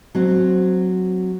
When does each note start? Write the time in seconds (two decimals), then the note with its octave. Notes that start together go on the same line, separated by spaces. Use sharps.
0.15 F#3 C4 F#4